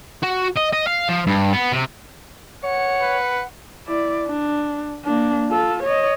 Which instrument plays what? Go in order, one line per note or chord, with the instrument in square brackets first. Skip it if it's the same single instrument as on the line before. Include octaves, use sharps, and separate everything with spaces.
[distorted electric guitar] F#4
D#5
D#5
F5
F3
G2
B3
C3
[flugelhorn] C#5 [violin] F#5 C#7
[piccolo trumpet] B4
[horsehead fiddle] E4 D5
D4
A#3 D4
F4 A4
C#5 D#5